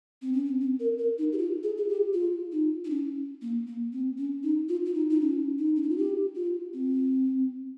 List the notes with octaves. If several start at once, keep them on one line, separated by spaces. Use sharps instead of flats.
C4
C#4
C4
C4
A#4
A#4
D#4
G4
F4
G#4
G#4
G4
F4
D#4
D#4
C#4
A#3
A#3
C4
C#4
D#4
F4
F4
D#4
D#4
C#4
D#4
C#4
D#4
F4
G4
F4
C4